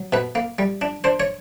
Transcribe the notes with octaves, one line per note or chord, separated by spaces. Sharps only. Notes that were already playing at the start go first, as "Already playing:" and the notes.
Already playing: F#3
B2 B4
A#3
G3
D4
D4 C5
C#5